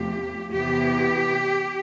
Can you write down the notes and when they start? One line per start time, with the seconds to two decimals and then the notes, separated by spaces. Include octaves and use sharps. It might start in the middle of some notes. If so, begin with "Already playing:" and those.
Already playing: E2 C3 F3 A3 G4
0.51 E2 C3 E3 B3 G4